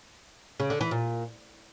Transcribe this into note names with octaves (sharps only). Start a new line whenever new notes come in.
C#3
D3
E3
A#2